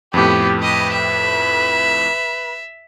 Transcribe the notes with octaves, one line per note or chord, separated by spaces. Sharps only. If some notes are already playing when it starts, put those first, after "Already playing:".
F2 A2 B3 G4
G4 B4 D#5
E5